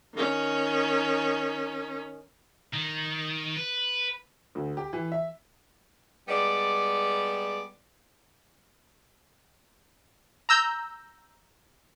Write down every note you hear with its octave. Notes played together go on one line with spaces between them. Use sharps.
D#3 C#4
D#3
B4
D2
G4
E3
E5
G3 G#3 B3 D5
A#5 E6 G6